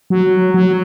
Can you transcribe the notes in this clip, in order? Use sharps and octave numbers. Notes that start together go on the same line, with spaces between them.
F#3
F#3